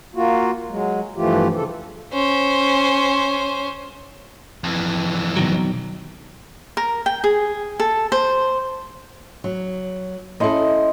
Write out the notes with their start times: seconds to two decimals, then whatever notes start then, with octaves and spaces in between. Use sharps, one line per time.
0.15 A#3 F4 F#4
0.70 F#3 G#3
1.16 G2 E3 F3 A3 F4 G4
1.55 C#3 A4
2.13 C#4 C5
4.64 F2 E3
5.37 B2 D#3 F#3
6.77 A#4
7.06 G5
7.24 G#4
7.80 A4
8.12 C5
9.44 F#3
10.40 C#4 E4 A4 D#5 C6